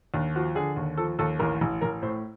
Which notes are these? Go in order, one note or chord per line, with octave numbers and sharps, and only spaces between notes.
D#2 D4
F3 F#4
D3 G#4
D#2
F3 A4
D#2 A4
A1 A#4
A1
A1 A#4
A2 C5